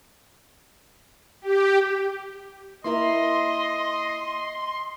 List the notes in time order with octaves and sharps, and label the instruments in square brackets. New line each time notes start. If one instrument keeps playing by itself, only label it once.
[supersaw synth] G4
[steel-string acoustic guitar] A#3 E4 A#4 [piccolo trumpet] D#5 [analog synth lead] C6